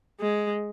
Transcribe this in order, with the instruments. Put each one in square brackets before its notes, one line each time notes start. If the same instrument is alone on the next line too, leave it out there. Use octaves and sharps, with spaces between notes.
[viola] G#3